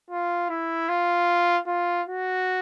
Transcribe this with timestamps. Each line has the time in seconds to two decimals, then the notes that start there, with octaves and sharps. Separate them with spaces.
0.10 F4
0.50 E4
0.88 F4
1.67 F4
2.07 F#4